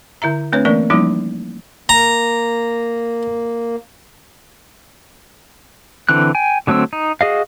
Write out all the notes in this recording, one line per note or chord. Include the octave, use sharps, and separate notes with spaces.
D3 E4 E5 A#5
A3 C4 D4 B4 C#5
E3 A3 A#3 C#4 A#4 D5
F3 G3 A#3 C#4 D#4 E4
A#3 A#5
D3 E3 C4 F#6
G5 G#5
D3 F#3 A3 C4 E6
D#4
F#4 G#4 D#5 F5